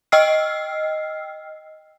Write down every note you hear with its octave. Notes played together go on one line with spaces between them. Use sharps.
D#5 G5 E6 F6 C7